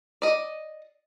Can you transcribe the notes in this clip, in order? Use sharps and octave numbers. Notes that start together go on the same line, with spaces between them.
D5 D#5